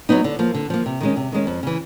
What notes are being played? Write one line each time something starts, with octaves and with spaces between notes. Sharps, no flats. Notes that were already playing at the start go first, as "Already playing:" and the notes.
F#3 B3 D#4
D3
F3 A#3
D3
F3 A#3
C3
D#3 G#3 C#4
C3
D#3 G#3 C#4
F2
C#3 E3